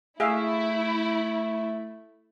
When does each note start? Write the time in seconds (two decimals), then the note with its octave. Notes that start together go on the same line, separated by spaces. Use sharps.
0.20 A3 E4 G#4 E5 F5